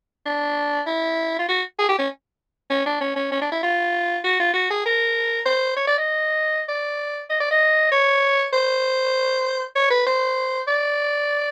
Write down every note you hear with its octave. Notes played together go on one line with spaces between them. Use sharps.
D4
E4
F4
F#4
G#4
G4
C#4
C#4
D4
C#4
C#4
C#4
D4
E4
F4
F#4
F4
F#4
G#4
A#4
C5
C#5
D5
D#5
D5
D#5
D5
D#5
C#5
C5
C#5
B4
C5
D5